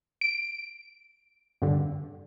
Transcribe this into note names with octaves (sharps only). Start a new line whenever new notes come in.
D7
G2 D3